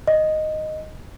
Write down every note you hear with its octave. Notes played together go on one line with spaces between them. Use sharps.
D#5